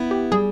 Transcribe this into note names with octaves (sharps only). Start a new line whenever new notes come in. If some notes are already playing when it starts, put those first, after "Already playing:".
Already playing: B3 E4
G4
G3 G#4